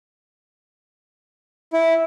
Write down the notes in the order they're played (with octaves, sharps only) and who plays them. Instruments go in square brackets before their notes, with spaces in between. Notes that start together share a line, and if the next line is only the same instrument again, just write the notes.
[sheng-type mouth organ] E4